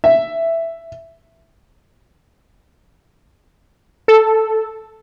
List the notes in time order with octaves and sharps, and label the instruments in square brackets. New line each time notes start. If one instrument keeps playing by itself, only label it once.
[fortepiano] E5
[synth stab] A4